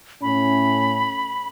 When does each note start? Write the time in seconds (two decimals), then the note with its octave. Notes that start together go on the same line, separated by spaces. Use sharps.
0.22 A2 C#4 B5